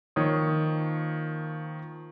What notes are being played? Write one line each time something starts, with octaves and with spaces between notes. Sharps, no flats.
D#3 F3 A#3 C#5 D#6